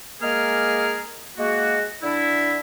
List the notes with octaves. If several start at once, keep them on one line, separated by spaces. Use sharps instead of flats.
G#3 A#3 G#4 A#4 F6
G#3 A#3 F#4
D3 D4 E4